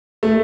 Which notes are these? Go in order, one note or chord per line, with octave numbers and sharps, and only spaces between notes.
A3